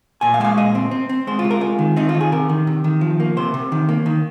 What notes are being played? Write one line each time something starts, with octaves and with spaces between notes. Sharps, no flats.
A#2 G#5
F5
G#3 F5 G#5
A#2 D#5
C4
C4
C4
G#3 C5
F4
C3
A#4
G#3 F4
D#3
C4 D#4
F4
D#3
G#4
C3 A#4
D#3
C3
D#3
F3
A#3
C3 C5
C3
D#3
A#3
D#3